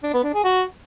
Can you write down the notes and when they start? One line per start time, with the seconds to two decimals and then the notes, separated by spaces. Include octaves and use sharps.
0.03 D4
0.14 B3
0.24 D4
0.34 G#4
0.44 F#4